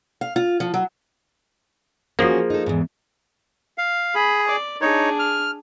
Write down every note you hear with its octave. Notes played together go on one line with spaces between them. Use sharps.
F5
F4
F3
F#3
F3 A#3 C#4 F#4 G#4
D#4 A4
E2 G#2
F5
G#4 B5
D5
D4 D#4 G#4 C#5
F6